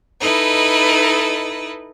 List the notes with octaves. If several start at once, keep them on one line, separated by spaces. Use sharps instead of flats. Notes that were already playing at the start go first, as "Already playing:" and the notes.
D#4 E4 A4 B4 D#5